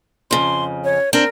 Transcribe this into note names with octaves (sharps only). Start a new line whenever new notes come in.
F2 C#3 C6
C#5
C4 D4 A#4